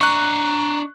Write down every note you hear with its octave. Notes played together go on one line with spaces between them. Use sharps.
D4 D#5 A#5 C#6 F#6